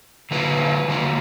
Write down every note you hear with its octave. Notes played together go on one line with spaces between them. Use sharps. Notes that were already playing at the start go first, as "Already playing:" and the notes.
D3 F#3 A#3 D#4 B4
D3 F#3 A#3 D#4